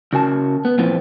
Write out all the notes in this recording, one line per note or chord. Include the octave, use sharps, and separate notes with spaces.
C#3 F#4 A#4 G#5 A5
B3
E2 A#2 E3 F3 B3 C4